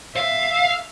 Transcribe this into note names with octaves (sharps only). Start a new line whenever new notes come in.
E5 F5